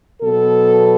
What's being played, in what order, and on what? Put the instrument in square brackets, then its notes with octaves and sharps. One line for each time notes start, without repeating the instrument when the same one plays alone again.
[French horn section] B2 F#3 B3 A4